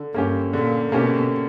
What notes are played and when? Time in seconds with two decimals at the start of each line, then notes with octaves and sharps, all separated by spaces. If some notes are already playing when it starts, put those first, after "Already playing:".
Already playing: D3
0.14 G2 A#3 C#4 G4
0.53 A#2 D3
0.92 B2 A#3 C#4 G4